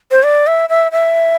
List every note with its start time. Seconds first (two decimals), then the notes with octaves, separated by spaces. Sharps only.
0.11 C5
0.23 D5
0.47 E5
0.69 E5
0.92 E5